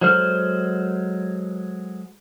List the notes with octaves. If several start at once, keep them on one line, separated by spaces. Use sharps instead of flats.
F#3 G#3 A4 C5 F6